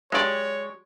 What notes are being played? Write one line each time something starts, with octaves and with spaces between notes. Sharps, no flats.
F#3 G#3 F#4 G4 C#5 D5